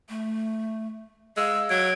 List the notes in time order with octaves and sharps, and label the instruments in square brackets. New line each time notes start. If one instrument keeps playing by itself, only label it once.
[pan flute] A3
[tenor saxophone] G#3 [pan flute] F5 [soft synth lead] E6
[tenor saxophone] F#3 [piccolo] G#6 [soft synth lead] D7